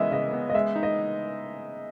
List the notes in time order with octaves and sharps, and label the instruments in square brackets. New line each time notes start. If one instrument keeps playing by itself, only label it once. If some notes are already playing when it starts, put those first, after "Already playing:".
Already playing: [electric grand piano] C#3 E3 G#3 B3 [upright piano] D#5 E5
[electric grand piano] C#3 [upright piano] D#5
[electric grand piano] B3
[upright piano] D#5
[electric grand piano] G#3 [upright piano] E5
[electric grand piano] D#4
[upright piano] D#5